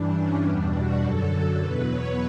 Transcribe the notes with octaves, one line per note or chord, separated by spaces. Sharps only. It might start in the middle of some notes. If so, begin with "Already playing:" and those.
Already playing: G2 E3 G3 D4
C#4
E2 B2 G3 D4
F#4
F#2 D3 F#3 A4
E2 B2 F#3 B4
C#5